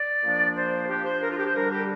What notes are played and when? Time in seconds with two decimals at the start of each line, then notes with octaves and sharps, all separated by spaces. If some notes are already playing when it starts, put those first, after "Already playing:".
Already playing: D5
0.22 A#2 F3 A#3 D4
0.55 C5
0.88 F3 D4 G4
1.05 C5
1.21 A#4
1.30 F4
1.38 G4
1.46 C5
1.54 D3 G3 D4 A#4
1.71 G4